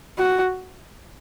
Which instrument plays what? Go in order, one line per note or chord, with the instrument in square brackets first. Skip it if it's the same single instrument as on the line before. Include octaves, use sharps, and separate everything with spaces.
[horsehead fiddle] F#4